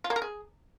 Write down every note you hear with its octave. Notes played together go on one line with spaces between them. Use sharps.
F4
A#3
A#4
G#4